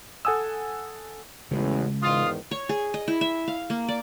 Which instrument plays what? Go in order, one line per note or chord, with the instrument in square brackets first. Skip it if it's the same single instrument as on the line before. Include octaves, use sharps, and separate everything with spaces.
[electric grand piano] A4 F#5 G#5 D#6 E6
[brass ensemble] A1 E2 [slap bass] C#3 G#3
[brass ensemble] E2 G#2 D#3 [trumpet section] F4 [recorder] D#6
[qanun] C#5
G#4
D#5
E4
E5
F5
A#3
D5